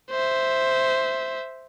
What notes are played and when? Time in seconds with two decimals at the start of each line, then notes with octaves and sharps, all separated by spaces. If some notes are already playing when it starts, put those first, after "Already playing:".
0.11 C5 E5